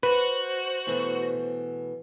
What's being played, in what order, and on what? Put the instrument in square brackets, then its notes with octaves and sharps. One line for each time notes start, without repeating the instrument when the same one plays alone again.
[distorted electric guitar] F#4 [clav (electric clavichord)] B4 [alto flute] C5
[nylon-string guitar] B2 E3 A3